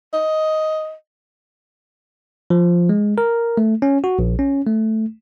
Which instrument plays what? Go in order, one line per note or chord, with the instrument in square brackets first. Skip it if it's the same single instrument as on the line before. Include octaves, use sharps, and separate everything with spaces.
[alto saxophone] D#5
[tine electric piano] F3
G#3
A#4
A3
C#4
F#4
A#1
C#4
A3